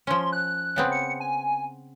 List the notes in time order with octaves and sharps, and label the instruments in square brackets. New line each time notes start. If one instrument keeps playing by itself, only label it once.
[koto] F3 C#4 [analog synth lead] C6
[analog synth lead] F#6
[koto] C#3 B3 C4
[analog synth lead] C#7
G#5